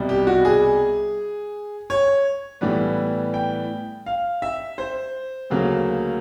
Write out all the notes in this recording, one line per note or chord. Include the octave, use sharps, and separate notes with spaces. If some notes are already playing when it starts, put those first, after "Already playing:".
Already playing: C2 B2 G3
G4
F#4
G#4
C#5
A2 E3 G3 B3
G5
F5
E5
C5
D2 C#3 F#3 A#3